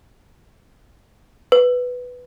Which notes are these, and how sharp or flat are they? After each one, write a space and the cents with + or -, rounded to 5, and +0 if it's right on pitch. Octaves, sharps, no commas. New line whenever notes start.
B4 +5